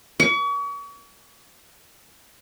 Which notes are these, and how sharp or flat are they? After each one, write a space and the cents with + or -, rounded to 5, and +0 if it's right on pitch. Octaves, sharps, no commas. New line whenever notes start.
C#6 +40